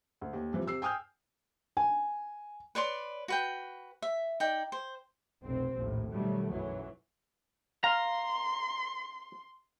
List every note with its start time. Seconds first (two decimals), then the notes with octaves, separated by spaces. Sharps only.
0.21 D2
0.33 D#2
0.53 C3 E3 F3
0.66 C3 E6 C7
0.82 G5 G#5 D#6 F6 G6
1.77 G#5
2.75 B4 C#5 D5 C6
3.28 F#4 B4 G5
4.02 E5
4.40 D#4 D5 G5
4.72 C5
5.44 F1 B1 C3 C4
5.76 A#1 D#2 A2
6.11 B2 D#3 F#3 G3 A3
6.50 B1 F#2 E3 F#3
7.84 F5 A#5 C6